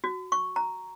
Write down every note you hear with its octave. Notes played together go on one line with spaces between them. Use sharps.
F#4
C#6
A#5